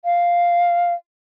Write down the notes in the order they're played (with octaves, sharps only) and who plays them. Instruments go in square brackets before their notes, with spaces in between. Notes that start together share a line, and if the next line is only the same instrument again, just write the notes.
[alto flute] F5